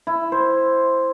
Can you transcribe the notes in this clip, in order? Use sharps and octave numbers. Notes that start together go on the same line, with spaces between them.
E4
C5